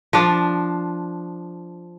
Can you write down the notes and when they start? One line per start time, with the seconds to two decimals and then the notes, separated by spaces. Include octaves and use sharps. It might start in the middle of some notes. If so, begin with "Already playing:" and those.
0.13 F3 D4